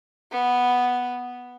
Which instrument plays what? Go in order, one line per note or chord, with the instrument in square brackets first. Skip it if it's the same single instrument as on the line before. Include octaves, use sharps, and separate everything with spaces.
[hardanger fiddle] B3